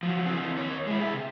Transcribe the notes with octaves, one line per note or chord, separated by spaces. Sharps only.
F3 F#3
E3 C4
D#2 C#5
G#3 E4
G#4 E5
C3